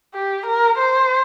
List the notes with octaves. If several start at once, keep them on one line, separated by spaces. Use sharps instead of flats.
G4
A#4
C5